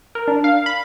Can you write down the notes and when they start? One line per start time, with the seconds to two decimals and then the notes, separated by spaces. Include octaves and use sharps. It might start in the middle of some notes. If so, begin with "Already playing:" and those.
0.15 A#4
0.28 D4
0.44 F5
0.66 B5